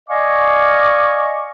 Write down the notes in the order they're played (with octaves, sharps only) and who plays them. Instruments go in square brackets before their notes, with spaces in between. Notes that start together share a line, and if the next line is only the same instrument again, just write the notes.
[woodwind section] D5 D#5 F5 G#5 C#6 D6